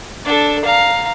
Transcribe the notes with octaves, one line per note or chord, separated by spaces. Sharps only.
D4 A4
F5 A#5